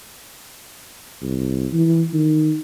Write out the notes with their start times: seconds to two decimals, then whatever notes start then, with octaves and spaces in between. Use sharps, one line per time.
1.22 C2
1.73 E3
2.13 D#3